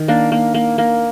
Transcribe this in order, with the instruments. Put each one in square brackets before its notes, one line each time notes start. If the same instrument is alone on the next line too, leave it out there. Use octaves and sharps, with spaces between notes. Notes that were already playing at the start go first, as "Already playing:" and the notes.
Already playing: [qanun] D#3
A#3 D4
A#3
A#3
A#3